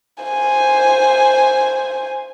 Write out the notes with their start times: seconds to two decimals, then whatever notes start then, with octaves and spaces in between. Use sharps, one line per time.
0.23 C5 G#5